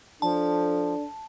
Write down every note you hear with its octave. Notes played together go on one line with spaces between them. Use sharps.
F3 D4 A4 A5